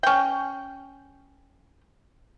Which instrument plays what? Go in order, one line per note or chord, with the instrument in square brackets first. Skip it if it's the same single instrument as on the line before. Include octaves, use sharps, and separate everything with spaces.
[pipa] C#4 G5